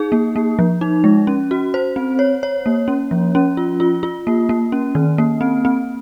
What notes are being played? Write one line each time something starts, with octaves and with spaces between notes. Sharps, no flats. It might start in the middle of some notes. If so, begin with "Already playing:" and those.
Already playing: D#4 G#4
A#3
A#3
F3
D#4
G#3
C#4
F#4
C5
C4
C#5
C#5
A#3
C#4
F3
C#4
F4
F4
F4
A#3
A#3
C#4
D#3
A#3
C4
C4